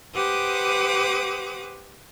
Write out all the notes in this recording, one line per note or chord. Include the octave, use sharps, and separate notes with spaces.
G4 B4 C5 F#5 D6 D#6